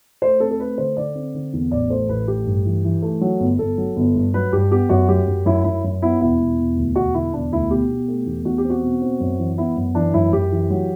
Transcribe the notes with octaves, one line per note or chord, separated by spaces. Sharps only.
A3 C5
C4 A4
A4
A3 B4
D3 C5
D3 D5
C4
D3
E2
A1 D5
A3 C5
A1 B4
A3 G4
G2
E3
E3
A3
F#3
G1
G1 A4
F#3
G1
G2
F#3 B4
G2 G4
B3 G4
F#2 F#4
F#3 G4
F#2
F#2 E4
F#2 E4
F#2
B3 E4
E1 E4
E1
E1
D2
E1 F#4
D3 E4
E1 D4
D2 E4
B2 G4
B2
A3
E2
E2 F#4
G4
C4
F#4
B2
C4
F#2
E3
B3 E4
F#2
E3 D4
F#2 E4
F#2 G4
E3
F#3